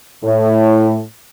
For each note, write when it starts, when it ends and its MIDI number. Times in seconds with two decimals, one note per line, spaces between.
0.24 1.02 45